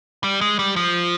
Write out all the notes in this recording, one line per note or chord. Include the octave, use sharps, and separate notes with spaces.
G3
G#3
G3
F3